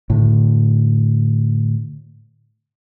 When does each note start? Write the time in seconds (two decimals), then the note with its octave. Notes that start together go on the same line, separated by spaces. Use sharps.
0.10 A2 D3